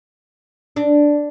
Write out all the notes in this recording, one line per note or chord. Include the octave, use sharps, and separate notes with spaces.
D4